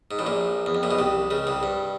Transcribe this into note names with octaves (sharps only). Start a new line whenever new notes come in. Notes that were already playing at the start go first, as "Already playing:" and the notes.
G#2
A1 A2
A#1 A#2
E2
F2
A#1 A#2
B1 B2
C2 C3
C#2 C#3
C2 C3
G2